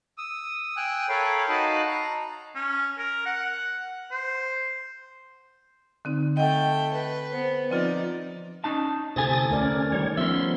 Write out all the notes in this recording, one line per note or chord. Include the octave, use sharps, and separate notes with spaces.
D#6 E6
G5 G#5 E6 F#6
A4 A#4 C#5 F5 G5 B5
D#4 F#4 D#5 F5 A5 B5
A#5
C#4
A#4
F#5
C5
D3 C4 D#4
A3 D#5 F#5 G5
B4
B3 C5
F3 C4 D#4 F4 D5
C#4 D#4 A5
D2 C3 E4 A4 C5 G#5 D#6 A6
A3 C#4 A#4 D5
D#3 G3 C#5
F3 B3 C#4 F4 E5 C6